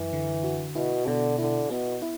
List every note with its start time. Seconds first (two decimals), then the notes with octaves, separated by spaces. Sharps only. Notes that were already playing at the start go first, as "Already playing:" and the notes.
Already playing: F#2 E3
0.13 D3
0.44 F#4
0.75 B2 E4
1.07 B2 D3
1.38 D3 E4
1.70 B2 B3
2.02 E4